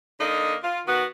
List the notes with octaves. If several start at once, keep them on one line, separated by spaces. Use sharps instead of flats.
D3 A#3 D#4 D#5
F4
D#3 B3 F#4